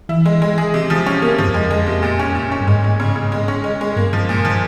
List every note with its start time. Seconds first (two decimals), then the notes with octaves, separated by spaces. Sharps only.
0.09 E3 E4
0.26 G#3
0.42 G#3
0.58 G#4
0.74 C3
0.90 F3
1.06 C#4
1.22 A#3
1.38 G2 F3
1.48 F2
1.54 G#3
1.69 F2 G#3
1.87 C3
2.03 A#2
2.19 C#4
2.35 A#2
2.52 C#4
2.61 G2
2.67 G#2 G#3
2.84 G#3
3.00 C#3
3.16 C#3
3.32 G#3
3.48 C#4
3.64 G#3
3.81 G#3
3.96 G2 A#3
4.13 F3
4.29 A#2
4.45 F3